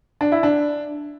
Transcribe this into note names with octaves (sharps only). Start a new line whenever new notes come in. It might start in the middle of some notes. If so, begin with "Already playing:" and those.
D4
E4
D4